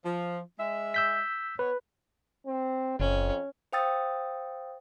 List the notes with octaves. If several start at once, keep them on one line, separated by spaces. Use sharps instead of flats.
F3
G#3 E5
E6 G6 B6
B3 B4 C#5
C4
F#1 F2 C#4
C5 F5 G5 D#6 E6 A6